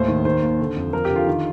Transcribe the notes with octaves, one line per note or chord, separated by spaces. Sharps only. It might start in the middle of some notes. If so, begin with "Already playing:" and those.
Already playing: D#2 A2 C5
D#3
D#3 C5
D#2
D3
F2
F3 A#4
G4
D3
F4
D#3